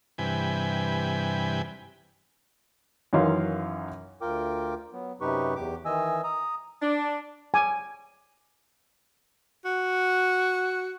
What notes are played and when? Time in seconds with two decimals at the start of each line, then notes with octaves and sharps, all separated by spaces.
0.18 G2 C3 E3 B4 G5 G#5
3.13 F#2 D#3 E3 C#4 F5 C6
4.21 D2 F4 A#4 G5 D6
4.93 F#3 B3
5.21 F#2 C3 D#4 G4 B4 C#6
5.56 E2 G4 D6
5.85 D#3 E3 D#5 G#5 E6
6.24 A#5 D#6
6.82 D4
7.54 G#5 D6
9.65 F#4